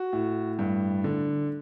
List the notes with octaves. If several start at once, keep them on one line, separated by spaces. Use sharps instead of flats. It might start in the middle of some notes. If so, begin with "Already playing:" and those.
Already playing: F#4
A2
G2
D3